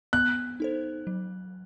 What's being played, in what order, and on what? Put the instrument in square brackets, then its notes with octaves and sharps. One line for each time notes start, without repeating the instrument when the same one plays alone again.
[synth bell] B3 [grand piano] F#6
[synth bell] D#4 A4 C5
F#3